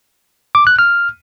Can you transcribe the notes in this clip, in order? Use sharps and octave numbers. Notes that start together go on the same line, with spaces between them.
D6
F#6
F6